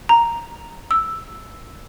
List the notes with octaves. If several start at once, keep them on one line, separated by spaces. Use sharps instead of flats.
A#5
E6